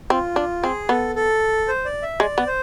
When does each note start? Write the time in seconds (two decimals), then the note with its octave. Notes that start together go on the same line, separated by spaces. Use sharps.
0.10 C4 F4
0.36 D4
0.63 C4 G#4
0.89 B3 A4
1.15 A4
1.68 C5
1.85 D5
2.02 E5
2.20 G#3 D5
2.38 B3
2.47 C5